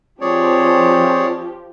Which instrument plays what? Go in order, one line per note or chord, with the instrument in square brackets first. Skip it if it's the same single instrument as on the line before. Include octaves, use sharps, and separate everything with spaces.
[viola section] F3 G4 [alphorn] C4 [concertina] G#4 C#5 D5